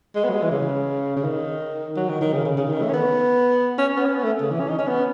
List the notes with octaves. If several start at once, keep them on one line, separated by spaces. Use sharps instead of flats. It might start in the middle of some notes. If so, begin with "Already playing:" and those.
G#3
B3
F#3
G#3
E3
C#3
C#3
D#3
F#3
D#3
D#3
C#3
C#3
C#3
D#3
A3
C#4
B3
C#4
B3
C#4
B3
A3
C#3
E3
C#4
D#4
C#4
B3